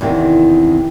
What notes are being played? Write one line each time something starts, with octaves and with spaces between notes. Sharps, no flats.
E2 C3 D#3 C4